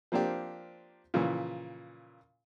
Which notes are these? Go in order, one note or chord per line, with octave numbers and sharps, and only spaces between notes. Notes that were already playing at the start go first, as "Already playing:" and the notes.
F3 A#3 C4 D4 G4
A#2 C#3 E3 F3